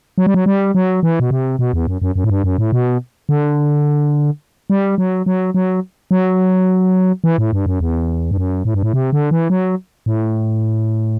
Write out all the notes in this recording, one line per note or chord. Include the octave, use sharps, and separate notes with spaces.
F#3
G3
F#3
G3
F#3
E3
B2
C3
B2
E2
F#2
F#2
F#2
A2
G2
F#2
A2
B2
D3
G3
F#3
F#3
F#3
F#3
E3
A2
G2
F#2
E2
G2
F#2
A2
G2
A2
C3
D3
E3
F#3
A2